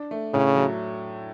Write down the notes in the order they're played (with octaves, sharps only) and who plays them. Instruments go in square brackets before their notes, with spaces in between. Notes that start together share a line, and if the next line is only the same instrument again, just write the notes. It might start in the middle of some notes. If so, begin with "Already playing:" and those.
Already playing: [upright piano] D4
A3
[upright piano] A2 [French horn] C#3
[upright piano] F#3